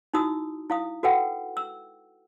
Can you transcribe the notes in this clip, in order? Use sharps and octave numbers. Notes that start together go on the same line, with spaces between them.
D#4 E4 F#4 D#6 E6
E4 F5 D#6
F#4 A4 B4 F#5 G5
E6